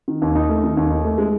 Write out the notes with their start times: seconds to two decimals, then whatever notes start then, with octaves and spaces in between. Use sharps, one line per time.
0.08 D#3
0.22 D#2
0.35 D#4
0.49 A3
0.64 D#3
0.77 D#2
0.90 D#4
1.05 A3
1.18 G#3